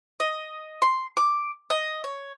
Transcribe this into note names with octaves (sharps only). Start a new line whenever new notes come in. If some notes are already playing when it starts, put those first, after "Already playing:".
D#5
C6
D6
D#5
C#5